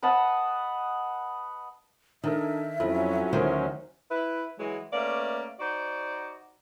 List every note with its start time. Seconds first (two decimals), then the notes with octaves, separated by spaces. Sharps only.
0.03 B4 D#5 F#5 A5
2.24 D#3 D4 D#4 A4 E5
2.80 F2 F#3 C#4 E4 F4 A4
3.33 D2 D#3 C5
4.11 E4 B4
4.59 E3 F#3 G#3
4.93 A3 A#3 C#4 B4 D5
5.60 D#4 F#4 C5 D5